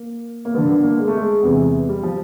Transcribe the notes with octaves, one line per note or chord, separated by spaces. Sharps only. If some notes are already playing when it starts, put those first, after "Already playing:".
Already playing: A#3
A#3
G2 D3 B3
B3
A#3
G#3
A3
G#3
E2 C3 E3
G3
F3